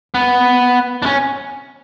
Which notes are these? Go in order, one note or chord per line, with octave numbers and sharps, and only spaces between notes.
B3
D4
C#4